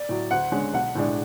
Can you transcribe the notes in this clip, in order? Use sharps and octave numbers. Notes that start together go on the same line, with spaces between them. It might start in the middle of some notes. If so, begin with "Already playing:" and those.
Already playing: D5
A2 F#3
D2 F#5
D3 G#3 C#4
B1 F#5
A2 G#3 D4